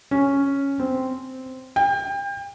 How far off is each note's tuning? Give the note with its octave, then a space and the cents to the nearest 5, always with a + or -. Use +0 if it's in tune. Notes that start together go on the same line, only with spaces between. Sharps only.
C#4 +0
C4 -10
G5 +35